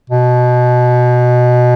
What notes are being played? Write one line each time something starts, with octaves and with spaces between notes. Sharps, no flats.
B2